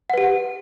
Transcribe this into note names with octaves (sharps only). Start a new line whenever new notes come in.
G4 B4 F#5